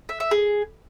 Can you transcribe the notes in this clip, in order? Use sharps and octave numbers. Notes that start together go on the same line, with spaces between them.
E5
E5
G#4